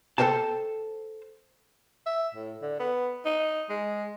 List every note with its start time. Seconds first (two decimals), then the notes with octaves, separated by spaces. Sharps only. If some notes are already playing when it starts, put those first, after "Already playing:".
0.18 A4 A#4 C5 G5 A5
2.07 E5
2.35 A2
2.62 D3
2.79 B3
3.26 D#4
3.70 G#3